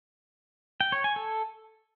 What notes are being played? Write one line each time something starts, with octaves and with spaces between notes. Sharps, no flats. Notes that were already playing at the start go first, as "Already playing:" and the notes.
G5
C#5
G#5
A4